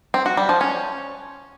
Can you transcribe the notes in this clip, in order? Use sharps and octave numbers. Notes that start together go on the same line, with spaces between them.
C4
F#4
G3
F3
C#4